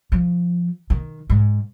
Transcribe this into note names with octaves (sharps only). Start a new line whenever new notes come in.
F3
D#3
G#2